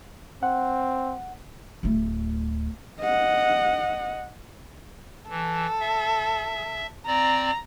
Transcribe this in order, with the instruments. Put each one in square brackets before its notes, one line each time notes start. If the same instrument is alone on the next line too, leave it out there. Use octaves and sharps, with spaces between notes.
[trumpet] C4 [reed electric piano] F#5
[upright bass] D1 A3
[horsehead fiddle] D#5 F#5
[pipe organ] E3 [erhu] A4
[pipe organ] E5
[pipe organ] C4 D5 [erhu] A#5